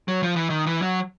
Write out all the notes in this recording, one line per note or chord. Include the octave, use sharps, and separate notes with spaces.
F#3
F3
E3
D#3
E3
F#3